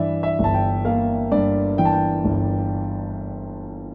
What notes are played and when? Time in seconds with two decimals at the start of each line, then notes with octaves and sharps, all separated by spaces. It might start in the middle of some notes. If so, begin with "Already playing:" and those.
Already playing: G2 E3 D5 E5
0.23 E5
0.39 G1 A5
0.54 G5
0.85 A#3 F5
1.32 G2 D5
1.78 E3 G5
1.85 A5
1.93 G5
2.25 G1